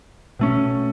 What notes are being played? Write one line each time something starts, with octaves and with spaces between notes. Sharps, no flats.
B2 A3 C#4